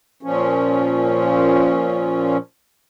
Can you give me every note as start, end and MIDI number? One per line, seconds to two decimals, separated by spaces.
0.23 2.37 46
0.23 2.37 53
0.23 2.37 61